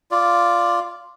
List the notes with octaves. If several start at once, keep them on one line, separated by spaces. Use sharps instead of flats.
F4 D5